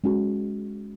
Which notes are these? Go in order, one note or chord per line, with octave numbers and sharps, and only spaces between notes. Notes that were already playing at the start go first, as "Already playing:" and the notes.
G#3 C#4 F#4